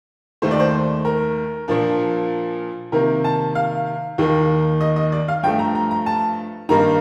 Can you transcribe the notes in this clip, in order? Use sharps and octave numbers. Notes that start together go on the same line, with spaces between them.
D#2 D#3 A3 C5
D5
C5
A#4
A#2 F3 A#3 D4
C3 D#3 A#3 A#4
A5
F5
D#2 D#3 A#3
D#5
D#5
D5
F5
G2 F3 A3 G5
A#5
A#5
A#5
A5
G2 D#3 A#3 D#4 A#5